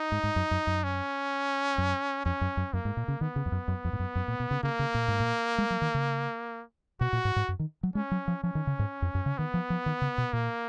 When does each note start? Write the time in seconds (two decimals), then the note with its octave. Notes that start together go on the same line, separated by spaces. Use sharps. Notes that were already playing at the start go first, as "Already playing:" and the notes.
Already playing: D#4
0.12 G#2
0.23 G#2
0.36 F#2
0.51 F#2
0.67 F#2
0.84 C#4
1.78 F#2
2.25 F2 C#4
2.41 F#2
2.57 F#2
2.73 F#2 A#3
2.85 G#2
2.97 A#2
3.08 C#3
3.21 D#3 B3
3.36 C#3
3.46 F2
3.52 F#2
3.68 F#2
3.85 F2
3.93 G#2
4.00 F#2
4.15 F#2
4.28 A#2
4.40 B2
4.51 C#3
4.63 C#3 A#3
4.79 C#3
4.95 A#2
5.08 G#2
5.20 A#2
5.58 G#3
5.70 F#3
5.82 D#3
5.94 C#3
7.01 B2 F#4
7.13 A#2
7.25 G#2
7.36 G#2
7.48 F#2
7.59 D#3
7.83 F#3
7.95 G#3 C#4
8.11 F#3
8.28 F3
8.43 F3 C#4
8.55 D#3
8.67 C#3
8.79 G#2
9.02 F2
9.15 F#2
9.26 C#3
9.38 D#3 B3
9.54 F3
9.70 F3
9.86 D#3
10.02 C#3
10.18 B2
10.33 A#2 A#3